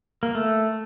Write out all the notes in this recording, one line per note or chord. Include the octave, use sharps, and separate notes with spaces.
A#3
A3